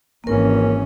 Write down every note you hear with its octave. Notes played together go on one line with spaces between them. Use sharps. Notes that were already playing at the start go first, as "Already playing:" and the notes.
G#1 E3 A#3 C#4 A#4